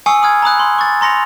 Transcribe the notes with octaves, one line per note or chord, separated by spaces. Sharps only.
G#5 C#6 D#6 E6 C7 C#7
B5 D#6 F6 G#6
A#5 B5 D#6 F#6
B5 C6
C#6 A6
A#5 C6 A#6 C#7 F7